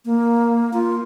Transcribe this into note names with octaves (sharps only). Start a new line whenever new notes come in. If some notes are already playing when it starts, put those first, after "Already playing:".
A#3
F4